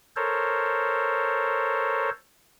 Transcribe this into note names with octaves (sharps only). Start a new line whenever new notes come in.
A4 A#4 C5 C#5